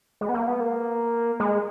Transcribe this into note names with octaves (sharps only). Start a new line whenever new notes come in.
G#3
B3
A#3
B3
A#3
G#3